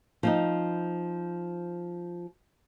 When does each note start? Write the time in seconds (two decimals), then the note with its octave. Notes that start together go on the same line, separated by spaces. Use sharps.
0.23 F3 C4 D#4